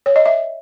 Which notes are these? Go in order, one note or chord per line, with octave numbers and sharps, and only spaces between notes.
C#5
D#5
E5